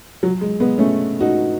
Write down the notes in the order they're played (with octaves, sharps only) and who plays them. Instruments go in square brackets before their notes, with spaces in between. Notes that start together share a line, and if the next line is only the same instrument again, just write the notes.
[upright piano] F#3
G#3
G#3 B3
A3 C#4
D#4 F#4